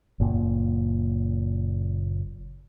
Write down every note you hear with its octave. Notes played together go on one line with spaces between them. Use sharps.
F#1 A#2